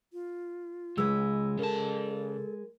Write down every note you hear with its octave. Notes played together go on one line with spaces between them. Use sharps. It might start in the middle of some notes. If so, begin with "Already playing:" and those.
F4
C#2 G#3 B4 E6
C#3 A4 A#4 A5